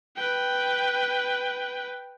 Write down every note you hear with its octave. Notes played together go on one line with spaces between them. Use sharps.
B4 G5